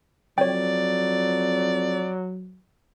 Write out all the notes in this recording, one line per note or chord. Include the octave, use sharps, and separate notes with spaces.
F2 F#3 C#5 D5 G5